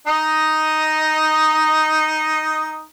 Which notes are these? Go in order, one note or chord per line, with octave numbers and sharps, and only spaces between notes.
D#4 D#5